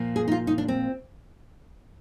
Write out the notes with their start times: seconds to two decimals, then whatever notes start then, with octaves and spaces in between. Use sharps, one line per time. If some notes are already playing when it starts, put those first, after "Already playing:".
Already playing: A#2 F3
0.16 G#4
0.28 D#4
0.32 F4
0.47 D#4
0.58 D4
0.68 C4